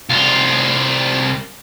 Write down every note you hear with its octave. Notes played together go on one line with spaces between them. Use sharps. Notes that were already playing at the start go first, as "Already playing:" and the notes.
C2 F4